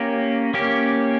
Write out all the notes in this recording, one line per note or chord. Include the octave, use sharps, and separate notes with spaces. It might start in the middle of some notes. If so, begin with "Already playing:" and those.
Already playing: A#3 C#4 G4
A#3 C#4 G4